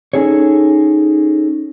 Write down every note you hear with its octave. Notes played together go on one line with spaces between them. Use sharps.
C#4 D#4 G#4 A4 C#5